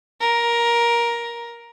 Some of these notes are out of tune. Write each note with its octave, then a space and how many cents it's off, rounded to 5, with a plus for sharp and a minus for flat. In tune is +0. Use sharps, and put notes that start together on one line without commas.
A#4 +15